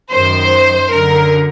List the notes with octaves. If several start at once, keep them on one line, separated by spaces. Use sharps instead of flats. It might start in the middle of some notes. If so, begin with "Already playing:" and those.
F#2 D#3 C5
F#2 D3 A#4